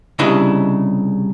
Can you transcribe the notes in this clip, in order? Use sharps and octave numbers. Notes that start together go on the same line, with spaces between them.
C2 C#3 D4 E4 D#5